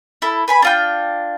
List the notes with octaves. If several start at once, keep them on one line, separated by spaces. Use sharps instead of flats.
E4 A4
B4 G#5 B5
D4 F4 G5